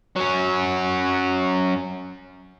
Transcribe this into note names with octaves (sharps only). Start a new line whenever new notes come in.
F#3 C#4